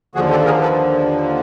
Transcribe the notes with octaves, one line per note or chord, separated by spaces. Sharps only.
D#2 D3 F3 F#4 G#4
G4 A4
G#4 A#4
A4 B4